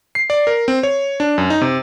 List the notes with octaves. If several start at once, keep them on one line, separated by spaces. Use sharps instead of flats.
C7
D5
A#4
C4
C#5
D4
F#2
D#4
C3